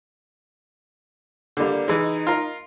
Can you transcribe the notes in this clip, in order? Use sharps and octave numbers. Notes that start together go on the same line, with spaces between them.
D3 G3 A#3
E3 G#3 D#4
F4 A#4